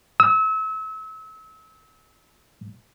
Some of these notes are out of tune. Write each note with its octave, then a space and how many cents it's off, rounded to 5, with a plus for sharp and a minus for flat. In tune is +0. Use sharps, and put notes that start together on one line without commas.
E6 -35